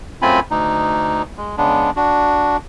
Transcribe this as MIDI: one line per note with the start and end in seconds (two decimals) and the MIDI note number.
0.22 0.40 42
0.22 0.40 57
0.22 0.40 60
0.22 0.40 65
0.22 0.40 80
0.22 0.40 83
0.51 1.22 38
0.51 1.22 63
1.38 1.56 56
1.58 1.91 49
1.58 1.91 56
1.58 1.91 59
1.58 1.91 62
1.96 2.57 62
1.96 2.57 66